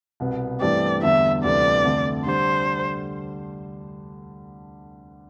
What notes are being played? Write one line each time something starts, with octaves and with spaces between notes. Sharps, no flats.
C2 B2 B3
G2 E3 A3 C4 G4 D5
E2 D3 G3 E5
D2 C3 E3 G3 D5
F2 D3 A3
D3 G3 D4 C5